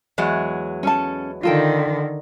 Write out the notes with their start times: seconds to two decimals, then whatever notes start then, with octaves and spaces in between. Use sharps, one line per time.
0.18 E2 F#3 G#3
0.83 C#4 A4 A5
1.43 D3 D#3 F4 A4 G5